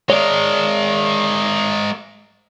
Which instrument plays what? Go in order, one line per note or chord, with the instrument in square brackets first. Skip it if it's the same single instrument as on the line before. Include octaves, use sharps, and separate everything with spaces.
[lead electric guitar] G#3 A#4 [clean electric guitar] C#5 D5